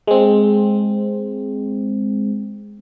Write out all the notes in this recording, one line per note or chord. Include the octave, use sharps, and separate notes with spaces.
G#3 C4